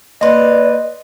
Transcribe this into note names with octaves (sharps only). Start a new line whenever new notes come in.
A#3 B4 D5 D#5 C6